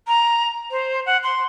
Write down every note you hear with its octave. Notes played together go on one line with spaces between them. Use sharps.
A#5
C5
F#5
C6